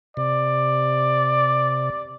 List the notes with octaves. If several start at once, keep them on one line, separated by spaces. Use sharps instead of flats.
C3 D5